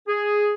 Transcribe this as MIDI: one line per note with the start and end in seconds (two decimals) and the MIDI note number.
0.08 0.54 68